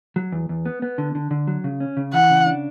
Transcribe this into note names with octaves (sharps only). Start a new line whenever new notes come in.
F#3
E2
E2
B3
B3
D3
D3
D3
F#3
C#3
C#4
C#3
E3 F#5
C#3
D4